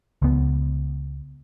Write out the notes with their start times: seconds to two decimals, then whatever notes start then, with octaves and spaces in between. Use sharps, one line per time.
0.22 C#2 B3